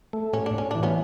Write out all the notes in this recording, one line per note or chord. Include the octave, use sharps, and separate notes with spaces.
A3
A2 C#4
D4
A2 C#4
E3 D4
B3 C#4